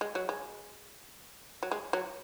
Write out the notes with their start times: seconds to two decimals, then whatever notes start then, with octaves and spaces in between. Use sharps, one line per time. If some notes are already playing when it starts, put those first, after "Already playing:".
0.01 G#3
0.15 F#3
0.29 G#3
1.63 F#3
1.71 G#3
1.93 F#3